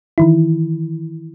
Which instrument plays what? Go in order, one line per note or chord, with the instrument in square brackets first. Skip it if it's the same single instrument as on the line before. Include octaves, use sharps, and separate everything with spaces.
[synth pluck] D#3 E3 E4